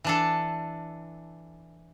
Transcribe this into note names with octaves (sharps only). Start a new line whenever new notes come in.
E3 D4 A4